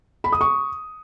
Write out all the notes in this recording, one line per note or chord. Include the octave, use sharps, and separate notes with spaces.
B5
D#6
C#6